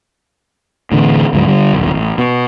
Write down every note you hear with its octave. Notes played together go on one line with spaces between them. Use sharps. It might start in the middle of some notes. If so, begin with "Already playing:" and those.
A2 D3 E3
D2 G#2 F#3
D3 G3
D#1 B1
A1
B2